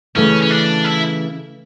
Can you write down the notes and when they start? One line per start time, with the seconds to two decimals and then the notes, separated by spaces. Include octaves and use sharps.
0.15 C#3 E3 A3 C#4
0.42 C#4
0.51 D4
0.85 E4